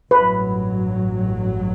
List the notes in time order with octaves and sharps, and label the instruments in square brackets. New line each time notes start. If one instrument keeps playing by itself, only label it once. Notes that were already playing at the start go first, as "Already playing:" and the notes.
[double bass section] A1 G2 F#3 [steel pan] B4